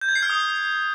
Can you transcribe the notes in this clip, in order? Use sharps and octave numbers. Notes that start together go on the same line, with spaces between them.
G6
G#6
C7
F6
D#6